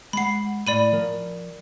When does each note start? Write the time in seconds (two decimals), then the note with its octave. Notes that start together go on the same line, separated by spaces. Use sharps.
0.13 G#3 F#5 B5 C7
0.67 A2 D5 B5 D#7
0.92 F3 A#4